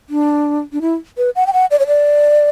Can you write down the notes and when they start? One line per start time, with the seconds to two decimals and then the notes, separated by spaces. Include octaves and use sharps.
0.10 D4
0.73 D4
0.81 E4
1.18 B4
1.36 F#5
1.47 G5
1.53 F#5
1.71 D5
1.79 C#5
1.87 D5